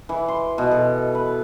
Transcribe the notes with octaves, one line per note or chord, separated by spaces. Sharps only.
E3
C6
B2
A4
B4